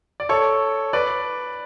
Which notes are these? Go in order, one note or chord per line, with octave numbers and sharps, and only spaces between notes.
D5
A4 C#5
B4 D5